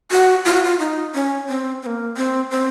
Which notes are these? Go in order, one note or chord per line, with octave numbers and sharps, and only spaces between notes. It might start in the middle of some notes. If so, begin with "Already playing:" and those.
F#4
F4
F#4
F4
D#4
C#4
C4
C4
A#3
C4
C4